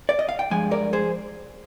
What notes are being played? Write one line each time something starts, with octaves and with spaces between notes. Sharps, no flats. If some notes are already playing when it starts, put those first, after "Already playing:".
D5
D#5
F5
G5
G2 F3 G#3 G#5
A#4 D5
G#4 C5